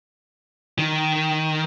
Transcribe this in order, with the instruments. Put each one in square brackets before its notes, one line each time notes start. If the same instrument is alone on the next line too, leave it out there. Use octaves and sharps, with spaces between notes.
[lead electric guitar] D#3